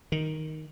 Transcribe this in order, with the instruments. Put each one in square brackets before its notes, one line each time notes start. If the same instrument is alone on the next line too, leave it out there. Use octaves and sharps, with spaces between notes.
[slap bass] D#3